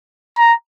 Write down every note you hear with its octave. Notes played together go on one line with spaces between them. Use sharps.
A#5